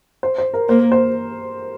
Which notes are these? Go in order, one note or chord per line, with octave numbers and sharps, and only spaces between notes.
C5
C5
A#4
A#3 C5
C5